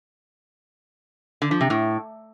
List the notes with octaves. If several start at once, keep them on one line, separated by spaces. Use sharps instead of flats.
D3
F3
C3
A2